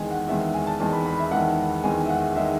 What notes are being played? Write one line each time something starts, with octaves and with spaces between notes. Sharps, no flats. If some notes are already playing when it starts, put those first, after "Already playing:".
Already playing: E2 D#3 G#3 G#5
F#5
E2 D#3 G#3 E5
G#5
A5
E2 D#3 G#3 A5
B5
B5
E5
E2 D#3 G#3 F#5
E2 D#3 G#3 G#5
E5
F#5
D#3 G#3 E5